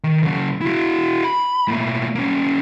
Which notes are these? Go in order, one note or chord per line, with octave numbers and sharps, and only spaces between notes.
D#3
C#3 F#3
E4 F#4
B5
A2 A#3
A#3 C#4